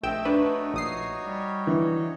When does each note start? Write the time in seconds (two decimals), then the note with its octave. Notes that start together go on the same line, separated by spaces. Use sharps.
0.03 A#1 A3 C4 A4 D#5 G5 E6
0.25 D4 D#4 F#4 B4 C#5
0.74 A#1 D#6 C7
1.25 G3
1.67 E3